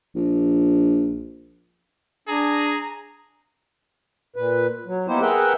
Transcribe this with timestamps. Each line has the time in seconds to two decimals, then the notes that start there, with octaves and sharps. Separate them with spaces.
0.15 A#1
2.28 D4 G#4 A#5
4.36 A#2 B4
4.86 F#3
5.08 A#3 B3 D#4 E4 G4 C5
5.22 G#4 A#4 B4 E5 F#5 G5